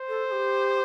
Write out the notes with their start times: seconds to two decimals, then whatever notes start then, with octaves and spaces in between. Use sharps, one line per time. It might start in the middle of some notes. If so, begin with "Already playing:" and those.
Already playing: C5
0.09 A4
0.27 A4
0.32 G4